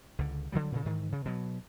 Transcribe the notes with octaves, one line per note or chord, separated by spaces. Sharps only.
C#2 D3
D3 D#3 F#3 G3
A#2 C#3
G#2 D#3 E3
C#3
B2 F#3